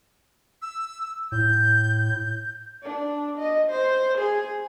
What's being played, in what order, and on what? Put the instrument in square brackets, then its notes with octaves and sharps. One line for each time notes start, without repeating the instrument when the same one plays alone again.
[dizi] E6
[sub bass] A2 [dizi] G6
[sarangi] D4
D#5
C5
G#4